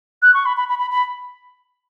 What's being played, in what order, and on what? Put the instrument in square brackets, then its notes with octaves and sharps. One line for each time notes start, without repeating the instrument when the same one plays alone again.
[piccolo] F#6
C#6
B5
B5
B5
B5
B5